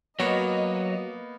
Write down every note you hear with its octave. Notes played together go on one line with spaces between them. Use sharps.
F#3 A#3 B3 F#4 C#5 D#5